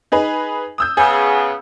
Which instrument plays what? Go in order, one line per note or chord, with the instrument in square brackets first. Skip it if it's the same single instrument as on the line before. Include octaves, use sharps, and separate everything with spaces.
[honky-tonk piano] D#4 G#4 B4
D#6 E6 G6
[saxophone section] C#3 B3 [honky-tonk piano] G#4